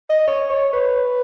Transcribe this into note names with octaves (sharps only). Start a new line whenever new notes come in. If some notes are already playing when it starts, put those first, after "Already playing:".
D#5
C#5
C#5
B4